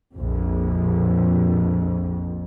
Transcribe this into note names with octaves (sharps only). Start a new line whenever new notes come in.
A#1 F2